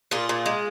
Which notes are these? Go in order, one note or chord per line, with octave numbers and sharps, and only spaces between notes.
A#2 F4 G#4
A#2
G#3